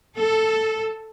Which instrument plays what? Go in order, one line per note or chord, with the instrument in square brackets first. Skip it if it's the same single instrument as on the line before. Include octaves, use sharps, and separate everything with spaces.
[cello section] A4